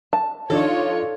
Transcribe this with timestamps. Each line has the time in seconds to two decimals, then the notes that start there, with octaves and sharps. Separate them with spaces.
0.13 A5
0.50 F3 D4 D#4 F4 A4 C#5